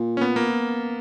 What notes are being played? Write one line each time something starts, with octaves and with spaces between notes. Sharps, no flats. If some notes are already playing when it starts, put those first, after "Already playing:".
Already playing: A#2
C#4
B3
A#3